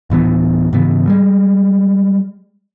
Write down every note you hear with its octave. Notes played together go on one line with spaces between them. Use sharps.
D1 A2 E3 B3
G#2 C#3 E3 B3
G3 G#3